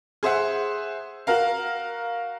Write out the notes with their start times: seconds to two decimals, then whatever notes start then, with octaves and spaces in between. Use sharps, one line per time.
0.23 G#4 C5 E5 F#5
1.27 F#4 A#4 F5